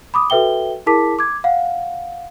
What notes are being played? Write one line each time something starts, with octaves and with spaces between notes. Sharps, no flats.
B5 D6 D#6
F#4 A4 B4 E5 G5 G7
E4 G#4 A#4 A5 D6 B6
D6 G#6
F5 F#5